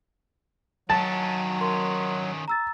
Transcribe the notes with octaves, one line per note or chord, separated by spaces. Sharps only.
D#3 F#3 C#4 A5
A#4 C6
A#5 E6 A6